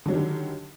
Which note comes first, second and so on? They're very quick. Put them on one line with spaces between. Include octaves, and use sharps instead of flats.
D3 F#3 G3 D#3